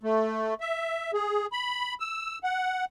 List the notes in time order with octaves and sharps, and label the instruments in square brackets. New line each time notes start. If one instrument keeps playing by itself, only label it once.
[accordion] A3
E5
G#4
B5
E6
F#5